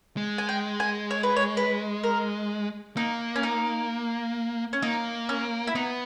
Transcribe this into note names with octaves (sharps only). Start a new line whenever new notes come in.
G#3
G#5
G5
G#5
C#5
B4
C#5
B4
A#4
A#3 D#4
C#4
D#4
C#4
A#3 D#4
C#4
E4
B3 D#4